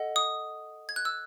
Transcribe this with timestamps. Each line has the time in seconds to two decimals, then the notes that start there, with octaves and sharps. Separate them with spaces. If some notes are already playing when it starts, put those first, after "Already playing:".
Already playing: A4 D#5 F#5
0.16 D#6
0.89 G#6
0.96 F#6
1.05 E6